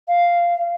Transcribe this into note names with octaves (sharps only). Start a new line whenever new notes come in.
F5